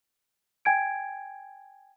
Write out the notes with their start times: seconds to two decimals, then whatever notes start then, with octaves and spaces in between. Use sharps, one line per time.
0.65 G5 G#5 G#6 D7